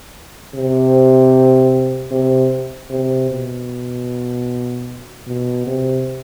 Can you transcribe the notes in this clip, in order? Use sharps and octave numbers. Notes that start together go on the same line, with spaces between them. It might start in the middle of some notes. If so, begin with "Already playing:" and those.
C3
C3
C3
B2
B2
C3